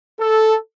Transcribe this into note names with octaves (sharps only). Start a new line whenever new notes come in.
A4